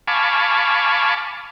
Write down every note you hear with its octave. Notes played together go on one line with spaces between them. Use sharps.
F5 G#5 A5 B5 C#6 D6